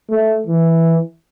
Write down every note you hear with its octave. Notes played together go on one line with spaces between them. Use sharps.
A3
E3